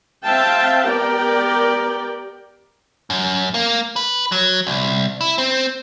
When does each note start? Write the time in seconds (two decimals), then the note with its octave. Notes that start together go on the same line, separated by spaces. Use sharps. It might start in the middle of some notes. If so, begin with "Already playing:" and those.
0.25 C4 C5 E5 F5 G5 A5
0.85 B3 G4 A#4 D5 G5
3.10 F#2
3.54 A#3
3.96 B4
4.32 F#3
4.67 C2
5.21 E4
5.38 C4